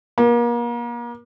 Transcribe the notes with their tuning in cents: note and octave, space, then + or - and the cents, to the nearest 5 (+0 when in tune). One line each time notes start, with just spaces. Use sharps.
A#3 +35